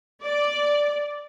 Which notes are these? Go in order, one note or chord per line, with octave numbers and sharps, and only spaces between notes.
D5